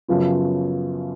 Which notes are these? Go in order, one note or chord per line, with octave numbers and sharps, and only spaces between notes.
F#2 C#3 F3 B3 F4